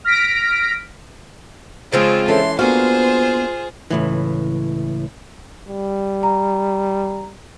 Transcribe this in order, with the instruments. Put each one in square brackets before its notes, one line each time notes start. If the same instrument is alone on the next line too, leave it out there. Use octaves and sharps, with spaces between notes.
[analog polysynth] F6 A#6 B6 D7
[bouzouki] C#3 F3 C4 [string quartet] G#3 F4 G#4
[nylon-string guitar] E3 C#4 A4 [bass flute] E5 [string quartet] C6
[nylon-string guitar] A#3 D4 F#4 [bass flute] B3 [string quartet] F4 G#4 C5 [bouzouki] F5
[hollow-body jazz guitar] C#2 A2 E3
[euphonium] G3
[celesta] A#5